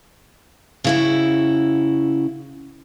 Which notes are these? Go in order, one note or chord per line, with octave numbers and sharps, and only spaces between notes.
C#3 E4 F#4